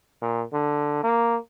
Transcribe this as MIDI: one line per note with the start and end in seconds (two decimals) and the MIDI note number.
0.22 0.42 46
0.53 1.01 50
1.03 1.36 58